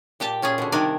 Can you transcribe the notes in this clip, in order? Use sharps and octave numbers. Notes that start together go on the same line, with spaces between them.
A#2 G4 G5 A5
A#2 C#4 F4 G#4
B2 D3
C3 D#3 G3 D4 A#4 G#5